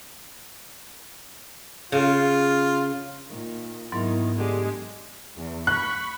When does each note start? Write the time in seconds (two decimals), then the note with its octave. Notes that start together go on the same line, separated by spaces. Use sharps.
1.92 C#3 F4
3.29 A#2 D#3
3.92 G#2 D#3 F#3 B3 E4
4.38 D3 G#3 G4 G#4
5.38 E2
5.67 B5 C#6 F#6